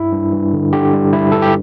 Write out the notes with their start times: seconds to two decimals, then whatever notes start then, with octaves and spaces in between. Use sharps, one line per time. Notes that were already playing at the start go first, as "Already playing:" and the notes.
Already playing: G2 E4
0.12 G2
0.33 G2
0.53 D3
0.73 D3 G4
0.93 G3
1.13 G2 E4
1.32 G2 A4
1.42 G4